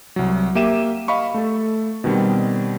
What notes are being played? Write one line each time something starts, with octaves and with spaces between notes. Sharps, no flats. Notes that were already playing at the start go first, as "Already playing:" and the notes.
C2 F#3
A#3 G4 E5 D#7 E7
D#5 F5 B5 C#6
A3 A4
B2 D#3 G3 C4